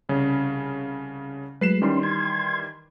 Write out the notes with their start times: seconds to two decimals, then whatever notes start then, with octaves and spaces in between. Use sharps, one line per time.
0.09 C2 C#3 C#4
1.61 F#3 G#3 A3 B4 C7 E7
1.82 D#3 E3 G3 C#4 C6
2.03 C6 G#6